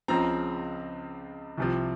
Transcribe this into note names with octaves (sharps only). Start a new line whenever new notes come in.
C#2 C#3 F3 C4 A#5
C2 C3 F3